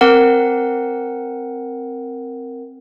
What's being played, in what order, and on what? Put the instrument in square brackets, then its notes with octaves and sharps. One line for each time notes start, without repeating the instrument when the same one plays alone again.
[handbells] C4 A#4 F#5